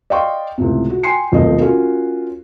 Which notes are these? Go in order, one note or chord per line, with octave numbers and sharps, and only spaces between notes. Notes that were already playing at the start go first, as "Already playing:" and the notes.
D5 D#5 F5 G5 C6 C#6
C#2 A2 C3
F#4
G5 G#5 C6 C7 C#7
D#1 B1 F3 A3 C4 D#5
C#4 F4 F#4 A#4